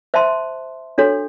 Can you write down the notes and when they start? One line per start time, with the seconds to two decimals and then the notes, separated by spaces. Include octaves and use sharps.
0.14 C5 E5 A5 C6
0.98 D4 F#4 A4 C#5